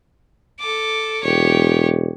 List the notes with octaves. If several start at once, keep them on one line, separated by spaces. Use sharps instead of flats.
A4 D6
E1 G4 C#5